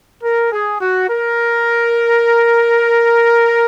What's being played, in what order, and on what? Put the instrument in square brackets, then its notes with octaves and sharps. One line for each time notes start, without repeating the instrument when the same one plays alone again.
[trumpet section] A#4
G#4
F#4
A#4